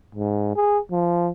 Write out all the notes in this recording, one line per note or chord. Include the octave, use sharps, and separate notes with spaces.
G#2
G#4
F3